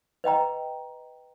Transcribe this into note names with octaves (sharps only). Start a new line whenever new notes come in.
B4 D#5 G5 A#5